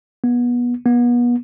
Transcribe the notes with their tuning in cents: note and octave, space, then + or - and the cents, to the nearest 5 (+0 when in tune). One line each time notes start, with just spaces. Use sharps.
B3 -25
B3 -35